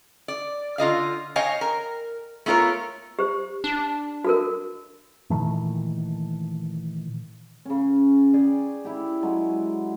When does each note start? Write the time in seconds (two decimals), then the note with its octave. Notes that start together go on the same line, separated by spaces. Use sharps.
0.28 D5
0.78 D3 F4 D#5 F5
1.36 C#5 D#5 F5 G5 G#5
1.61 A#4
2.46 A3 B3 F4 A#4 C#5
3.19 G4 C5
3.64 D4
4.25 F#4 A4 A#4
5.30 A#2 D#3 E3 A3
7.65 C#3 C#4
8.33 G#4 D5 G5
8.85 E4 G4
9.22 F#3 G#3